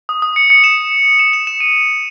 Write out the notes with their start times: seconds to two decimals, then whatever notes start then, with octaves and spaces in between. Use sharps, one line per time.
0.09 D#6
0.22 D#6
0.36 C#7
0.50 C#7
0.64 E7
1.19 E7
1.33 E7
1.47 E7
1.60 D#7